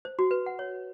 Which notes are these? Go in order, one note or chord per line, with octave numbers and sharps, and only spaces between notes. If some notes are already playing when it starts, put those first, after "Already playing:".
C5
F#4
B4
F#5
C#5